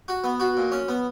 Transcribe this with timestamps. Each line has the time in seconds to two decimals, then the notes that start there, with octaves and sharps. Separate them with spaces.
0.08 F#4
0.24 B3
0.40 F#4
0.57 A#2
0.72 C#4
0.88 B3